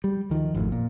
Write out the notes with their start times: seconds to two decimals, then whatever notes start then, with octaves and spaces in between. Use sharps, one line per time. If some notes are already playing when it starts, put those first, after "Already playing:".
0.04 G3
0.30 D2 D#3 F3
0.55 G#1 F2 A2
0.72 A#2